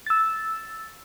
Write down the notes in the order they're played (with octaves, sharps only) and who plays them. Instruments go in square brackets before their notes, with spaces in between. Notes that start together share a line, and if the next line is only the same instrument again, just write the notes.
[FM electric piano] E6 A6